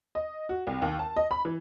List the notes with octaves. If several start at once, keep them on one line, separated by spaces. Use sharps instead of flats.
D#5
F#4
C2
D#2
A5
D#5
B5
E3